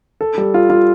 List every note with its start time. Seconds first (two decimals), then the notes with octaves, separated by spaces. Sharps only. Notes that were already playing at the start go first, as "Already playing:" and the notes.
0.21 A4
0.38 G3
0.54 F4
0.70 F4